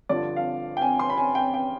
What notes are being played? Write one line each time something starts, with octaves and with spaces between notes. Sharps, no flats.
G2 D3 F3 D5
F5
G5
G#5
C6
B5
G#5
G5
G5